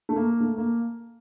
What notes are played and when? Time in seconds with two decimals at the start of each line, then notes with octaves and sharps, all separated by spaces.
0.09 A3
0.16 A#3
0.40 A3
0.58 A#3